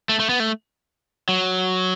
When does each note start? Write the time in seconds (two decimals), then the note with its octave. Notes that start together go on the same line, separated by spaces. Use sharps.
0.09 A3
0.20 A3
0.30 B3
0.40 A3
1.29 F#3